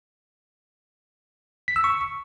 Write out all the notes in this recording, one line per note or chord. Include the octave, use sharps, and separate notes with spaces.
B6
E6
C#6